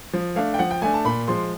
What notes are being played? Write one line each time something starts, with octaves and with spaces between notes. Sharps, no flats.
F3
A3 D4 F5
G5
F3 F#5
G5
A3 D4 G#5
A5
A#2 B5
F3 G#3 C6